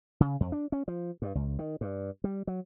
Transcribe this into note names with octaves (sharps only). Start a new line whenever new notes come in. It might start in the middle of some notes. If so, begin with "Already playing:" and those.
C#3
F2
D4
C#4
F3
G2
C#2
D#3
G2
G3
F#3